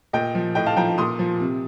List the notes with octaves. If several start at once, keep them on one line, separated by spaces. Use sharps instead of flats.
A#2 D#5 G5
F3
A2 D#5 G5
F5 A5
F3 G5 A#5
A#2 C6 D#6
F3
C3